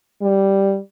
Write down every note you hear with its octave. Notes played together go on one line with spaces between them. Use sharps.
G3